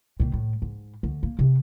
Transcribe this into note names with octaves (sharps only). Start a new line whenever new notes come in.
A#2 D#3
A2
G#2
D2
A#3
C3